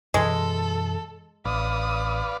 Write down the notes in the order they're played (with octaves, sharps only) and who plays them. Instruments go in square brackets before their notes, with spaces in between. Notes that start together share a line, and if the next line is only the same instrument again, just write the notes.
[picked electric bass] F#2 B2 E3 [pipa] G#3 [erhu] A4
[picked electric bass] A1 [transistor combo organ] B4 D5 F5 [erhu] D#6